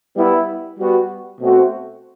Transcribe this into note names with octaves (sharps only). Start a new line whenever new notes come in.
G3 B3 E4
G3 B3 F#4
B2 A3 C4 F#4 C5